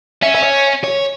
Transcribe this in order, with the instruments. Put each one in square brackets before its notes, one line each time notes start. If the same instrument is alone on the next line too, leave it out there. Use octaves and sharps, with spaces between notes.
[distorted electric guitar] C#4 [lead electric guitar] E5
[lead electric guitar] E5
C#5
C#5